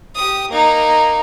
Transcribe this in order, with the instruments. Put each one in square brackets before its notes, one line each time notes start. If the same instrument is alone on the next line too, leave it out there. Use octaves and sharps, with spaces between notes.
[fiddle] G4 D#6
A#3 D#4